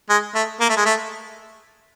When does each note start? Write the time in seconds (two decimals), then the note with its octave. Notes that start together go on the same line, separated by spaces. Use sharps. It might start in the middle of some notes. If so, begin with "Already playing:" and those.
0.09 G#3
0.35 A3
0.61 A#3
0.69 A3
0.77 G#3
0.85 A3